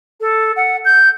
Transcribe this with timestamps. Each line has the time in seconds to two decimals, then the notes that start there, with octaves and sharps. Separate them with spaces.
0.20 A4
0.56 F#5
0.85 G6